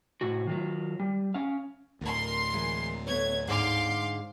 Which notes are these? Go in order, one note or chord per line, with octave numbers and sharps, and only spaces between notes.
A2 C3 F#4
D#3 F#3 F4
G3
C#4 F5
D2 A2 A#4 C6
E3 G#3
A3 B3 C#5 G#6
G#2 D3 G#3 F5 C6 D6